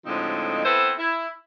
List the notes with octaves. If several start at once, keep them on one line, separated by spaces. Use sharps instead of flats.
A2 D3 F3 G#3 C4 D#4
B3 C4 E4 A4 B4 C5
E4